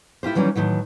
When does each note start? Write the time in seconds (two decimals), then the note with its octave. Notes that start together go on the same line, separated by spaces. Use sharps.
0.23 E4 F4 G4 C5
0.35 D#3 E3 F#3 G3 C#4
0.56 A2 D#3 E3 F#3